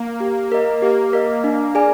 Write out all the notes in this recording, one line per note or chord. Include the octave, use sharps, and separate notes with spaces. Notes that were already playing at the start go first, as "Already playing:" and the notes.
Already playing: A#3
G4
A#4 D#5
A#3 G4
A#4 D#5
D4
G#4 D5 G#5